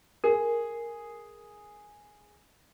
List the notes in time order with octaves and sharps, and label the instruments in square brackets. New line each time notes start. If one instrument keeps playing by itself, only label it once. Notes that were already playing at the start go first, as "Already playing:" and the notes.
[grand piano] G#4 [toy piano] A#4